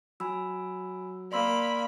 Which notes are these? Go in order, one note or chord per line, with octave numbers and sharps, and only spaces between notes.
F#3 G#5 B5 E6
A#3 D5 B5 C6 E6